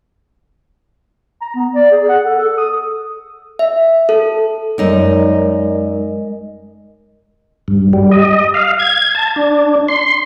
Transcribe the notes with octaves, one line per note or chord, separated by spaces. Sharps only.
A#5
B3
D5
G#4
F#5
A4
A4
D#6
E5
A4
F#2 G#3 D#4 A#4 D5 D#5
G2
G3
D#5
F5
G#6
A5
D4
C6